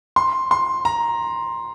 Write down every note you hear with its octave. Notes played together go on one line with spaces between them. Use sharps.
C6
C6
A#5